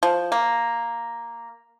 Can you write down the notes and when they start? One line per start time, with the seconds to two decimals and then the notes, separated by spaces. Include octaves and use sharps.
0.03 F3
0.32 A#3